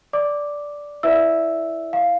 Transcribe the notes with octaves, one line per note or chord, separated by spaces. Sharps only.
D5 D6
E4 B4 D5 E5 E6
F5